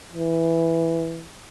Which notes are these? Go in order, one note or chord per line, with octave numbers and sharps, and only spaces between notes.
E3